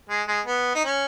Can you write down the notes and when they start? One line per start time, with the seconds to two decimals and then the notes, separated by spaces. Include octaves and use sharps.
0.09 G#3
0.28 G#3
0.46 B3
0.75 D#4
0.84 C#4